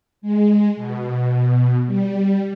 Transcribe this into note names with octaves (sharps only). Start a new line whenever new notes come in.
G#3
B2
G3